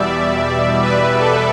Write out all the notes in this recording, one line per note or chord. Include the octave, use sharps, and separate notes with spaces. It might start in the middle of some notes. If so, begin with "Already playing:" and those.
Already playing: E2 B2 G3 D5 E5
B4
A4